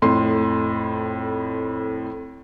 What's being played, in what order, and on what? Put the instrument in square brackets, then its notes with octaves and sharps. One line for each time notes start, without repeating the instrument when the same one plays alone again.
[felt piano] F2 A2 C6